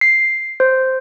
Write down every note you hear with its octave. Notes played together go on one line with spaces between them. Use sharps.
C7
C5